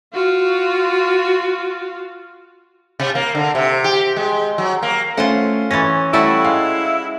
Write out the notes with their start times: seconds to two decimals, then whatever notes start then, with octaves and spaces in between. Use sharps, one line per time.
0.13 F4 F#4
3.00 C3
3.15 A#3
3.35 D3
3.55 C3
3.84 G4
4.16 G#3
4.58 F#3
4.82 A#3
5.17 A3 C#4 F4 C5 F#5
5.71 E3 C#4 A6 A#6
6.13 G3 A3 E4 F#4
6.44 G#3 F5